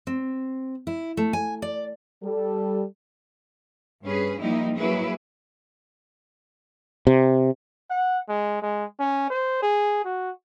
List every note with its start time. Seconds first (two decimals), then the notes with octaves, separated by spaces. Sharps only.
0.07 C4
0.87 E4
1.17 A3
1.33 G#5
1.62 D5
2.23 G3 A4
4.05 G2 C#4 G#4 B4
4.40 F3 G3 A#3 D#4 E4
4.76 F#3 A#3 E4 G#4 B4
7.07 C3
7.90 F#5
8.28 G#3
8.62 G#3
8.99 C#4
9.30 C5
9.62 G#4
10.05 F#4